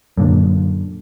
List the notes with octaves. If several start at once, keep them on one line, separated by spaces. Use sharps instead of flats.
F#2 A#2 D3